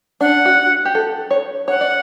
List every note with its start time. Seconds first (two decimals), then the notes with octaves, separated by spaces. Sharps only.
0.21 D4 F#5
0.45 F#4
0.85 G4
0.95 A4
1.31 C#5
1.68 C#5 F#5
1.81 D5